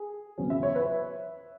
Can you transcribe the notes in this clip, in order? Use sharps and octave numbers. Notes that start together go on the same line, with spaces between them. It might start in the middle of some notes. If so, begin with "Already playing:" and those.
Already playing: G#4
E1 E2 C#3 F#3 C#4
E5
C#5
B4 E5